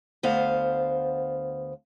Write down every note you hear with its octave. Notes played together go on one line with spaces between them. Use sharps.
D2 B3 C5 F5